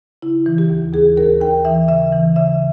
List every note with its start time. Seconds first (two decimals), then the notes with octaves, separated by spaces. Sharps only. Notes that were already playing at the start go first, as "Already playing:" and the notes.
0.22 C#3 E4
0.46 E3
0.58 G4
0.70 D#2
0.93 D#2 G#4
1.17 D#2 A#4
1.41 D#2 G5
1.65 E3 E5
1.88 C#3 E5
2.12 E3
2.36 C#3 E5